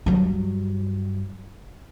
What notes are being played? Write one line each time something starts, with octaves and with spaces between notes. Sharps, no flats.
G2 F#3